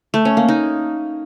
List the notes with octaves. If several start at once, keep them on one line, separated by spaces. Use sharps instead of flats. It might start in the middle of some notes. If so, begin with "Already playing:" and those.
A3
C#4
A#3
D#4